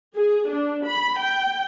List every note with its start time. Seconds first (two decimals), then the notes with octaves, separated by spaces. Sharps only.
0.15 G#4
0.49 D4
0.86 B5
1.18 G5